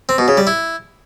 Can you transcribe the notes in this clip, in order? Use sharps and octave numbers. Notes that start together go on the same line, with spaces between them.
C4
B2
C#3
G3
E4